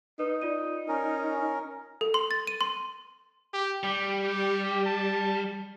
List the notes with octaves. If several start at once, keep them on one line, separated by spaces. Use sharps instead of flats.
D#4 B4
F4 D5 D#7
C#4 A#4
A4
C6
A6
D#7
C6
G4
G3 G4
G4
A5